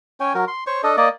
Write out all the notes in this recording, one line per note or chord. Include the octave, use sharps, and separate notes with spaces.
C#4 C#5 G5 G#5
F#3 A#4
C6
C5 C#5 C#6
D4 A4 D#5
A#3 D5 D#5